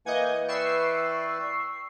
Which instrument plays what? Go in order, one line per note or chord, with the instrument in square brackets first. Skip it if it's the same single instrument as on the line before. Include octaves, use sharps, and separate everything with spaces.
[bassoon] E3 [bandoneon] A#3 F#5 G#5 [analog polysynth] D#5 G6 G#6
[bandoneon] B4 D5 G5 [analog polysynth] C#6 E6 C7